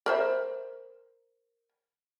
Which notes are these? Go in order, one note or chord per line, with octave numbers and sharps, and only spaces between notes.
A#4 C5 E5